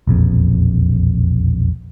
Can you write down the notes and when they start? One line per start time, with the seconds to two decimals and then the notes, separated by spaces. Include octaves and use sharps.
0.07 E1 A#1 F2